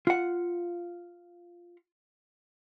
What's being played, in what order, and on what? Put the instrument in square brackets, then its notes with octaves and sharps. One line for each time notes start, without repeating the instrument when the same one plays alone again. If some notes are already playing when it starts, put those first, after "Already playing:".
[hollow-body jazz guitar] F4 F#5